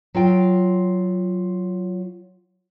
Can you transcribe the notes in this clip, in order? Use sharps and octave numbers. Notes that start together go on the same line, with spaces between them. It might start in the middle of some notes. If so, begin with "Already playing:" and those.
F#3 F4 G5